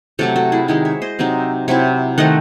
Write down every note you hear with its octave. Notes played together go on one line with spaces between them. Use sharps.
C3 F#3 A3 A4 C#5
F#4 A4
E4 G#4
D#3 G#3 D#4 E4 G#4
C#5 E5
C5 D#5
C3 F#3 C4 D#4
C3 F#3 C4 E4 C#5 E5
D#3 A3 C4 D#5 F#5